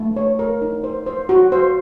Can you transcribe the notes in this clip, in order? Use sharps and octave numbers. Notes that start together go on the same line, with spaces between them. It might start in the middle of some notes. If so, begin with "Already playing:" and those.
Already playing: A3
C#5
A#4
D#4
C5
C5
F#4
C5